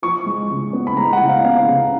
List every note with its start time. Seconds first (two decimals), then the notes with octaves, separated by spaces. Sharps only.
0.02 F3 C#6
0.26 G#3
0.50 C#3
0.73 B3
0.87 B5
0.97 G#3 A#5
1.13 F#5
1.21 C#3
1.29 F5
1.44 B3 F5
1.68 C#3